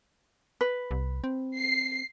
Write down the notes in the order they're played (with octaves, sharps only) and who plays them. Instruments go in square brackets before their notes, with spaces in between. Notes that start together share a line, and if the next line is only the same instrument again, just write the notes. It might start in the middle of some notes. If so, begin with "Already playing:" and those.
[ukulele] B4
[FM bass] C2
C4
[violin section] C7